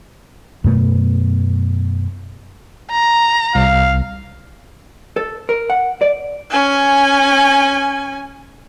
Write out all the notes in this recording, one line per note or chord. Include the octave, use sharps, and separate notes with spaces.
F#2 B2 A3 B3
A#5
C2 F5
A4
A#4
F#5
D5
C#4 G#5